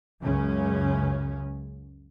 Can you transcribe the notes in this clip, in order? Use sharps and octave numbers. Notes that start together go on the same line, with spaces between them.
C#2 F#2 C#3 C#4